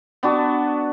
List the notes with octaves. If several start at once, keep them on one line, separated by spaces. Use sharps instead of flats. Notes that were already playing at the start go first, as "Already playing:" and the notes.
B3 D4 F#4 A5